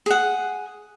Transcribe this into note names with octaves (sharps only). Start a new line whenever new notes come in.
G#4 F#5